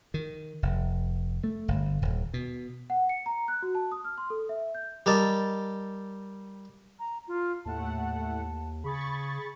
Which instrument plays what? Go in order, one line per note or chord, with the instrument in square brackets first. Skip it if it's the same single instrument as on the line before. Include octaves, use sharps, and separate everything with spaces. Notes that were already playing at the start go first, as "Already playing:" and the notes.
[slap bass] D#3
F1
A3
G1
D#1
B2
[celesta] F#5
C#7
A#5
F#6
F#4
A5
D#6
F6
C6
A4
E5
G6
[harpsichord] G3 A#4 D#5 A5
[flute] A#5
F4
[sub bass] D#2 [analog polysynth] A2 A3 F#5 [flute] A5
[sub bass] C#3 [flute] G#4 [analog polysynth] B5 C#6 A6